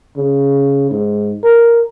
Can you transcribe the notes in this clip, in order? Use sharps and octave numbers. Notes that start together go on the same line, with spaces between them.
C#3
G#2
A#4